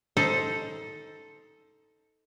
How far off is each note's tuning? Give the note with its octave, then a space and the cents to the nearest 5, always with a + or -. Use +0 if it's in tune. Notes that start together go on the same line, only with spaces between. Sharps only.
D#4 +20 A4 +0 C5 +0